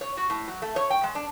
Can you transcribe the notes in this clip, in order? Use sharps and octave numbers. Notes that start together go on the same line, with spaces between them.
C#5
F#4
A2
F#3
A3
C#5
G5
G#3
D4